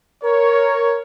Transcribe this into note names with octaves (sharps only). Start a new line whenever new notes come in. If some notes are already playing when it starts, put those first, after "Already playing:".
A#4 C#5